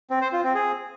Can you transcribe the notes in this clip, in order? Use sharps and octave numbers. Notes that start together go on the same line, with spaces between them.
C4
C5
F4
C4
G#4